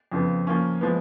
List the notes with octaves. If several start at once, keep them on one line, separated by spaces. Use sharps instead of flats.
F2 C#3 F3 B3
F3 A#3 C#4
F3 G#3 B3